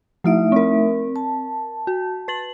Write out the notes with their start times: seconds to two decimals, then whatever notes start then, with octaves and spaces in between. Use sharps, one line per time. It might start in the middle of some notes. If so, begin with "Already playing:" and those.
0.24 F3 A3 D#4 E4 E5 D7
0.52 C4 A#4
1.16 A5
1.87 F#4
2.28 B4 A6 F#7